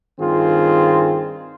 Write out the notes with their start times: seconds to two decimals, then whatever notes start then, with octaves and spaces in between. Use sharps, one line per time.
0.20 G2 D#3 C4 F4 G#4